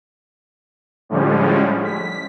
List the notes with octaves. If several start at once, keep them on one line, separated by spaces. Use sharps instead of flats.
A2 D3 F3 G3 G#3 C#4
B6